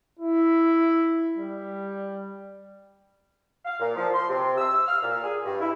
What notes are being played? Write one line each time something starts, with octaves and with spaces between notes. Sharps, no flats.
E4
G3
F5
A#2
F3
C6
C3
E6
F6
A#2
G#4
G2
E4